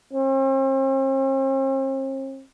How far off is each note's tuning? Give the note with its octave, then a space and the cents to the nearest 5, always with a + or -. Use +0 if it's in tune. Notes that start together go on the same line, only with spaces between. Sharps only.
C4 +45